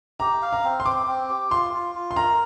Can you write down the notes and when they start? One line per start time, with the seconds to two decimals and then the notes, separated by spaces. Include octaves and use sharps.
0.20 G4 A#5
0.42 F5
0.53 A#5
0.64 C4
0.80 C6
0.86 C4 D6
1.07 C4
1.29 G4
1.51 F4 C6
1.74 F4
1.95 F4
2.11 C6
2.16 A#4 A#5